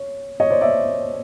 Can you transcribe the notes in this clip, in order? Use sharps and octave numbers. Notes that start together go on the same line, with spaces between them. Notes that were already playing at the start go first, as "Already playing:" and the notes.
Already playing: C#5
C#5 D#5
C5 D5
D5 E5